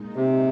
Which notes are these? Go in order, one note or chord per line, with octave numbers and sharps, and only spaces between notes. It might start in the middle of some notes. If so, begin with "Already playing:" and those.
Already playing: A#2 G#3 D#4
C3